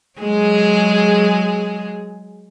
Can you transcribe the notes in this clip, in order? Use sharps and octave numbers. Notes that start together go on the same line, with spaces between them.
F#3 G#3 G#4